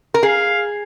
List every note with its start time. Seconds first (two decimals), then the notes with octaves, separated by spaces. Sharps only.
0.14 A#4
0.23 G#4 F5